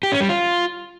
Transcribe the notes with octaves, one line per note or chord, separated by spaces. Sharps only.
G4
C#4
G3
F4